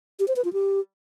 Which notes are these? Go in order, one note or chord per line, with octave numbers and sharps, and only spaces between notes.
G4
C5
B4
F4
G4